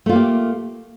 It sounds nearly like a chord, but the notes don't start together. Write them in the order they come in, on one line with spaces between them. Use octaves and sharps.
A3 F4 A#3 G4